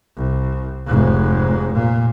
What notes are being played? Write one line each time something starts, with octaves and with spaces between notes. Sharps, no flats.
C2
F1 G#2
A#2